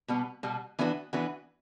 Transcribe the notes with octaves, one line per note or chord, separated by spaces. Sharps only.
B2 G3 B3
B2 G3 B3
E3 B3 D4 F#4 B4
E3 B3 D4 F#4 B4